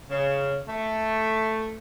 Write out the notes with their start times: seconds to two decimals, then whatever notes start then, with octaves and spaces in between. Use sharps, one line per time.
0.10 C#3
0.68 A3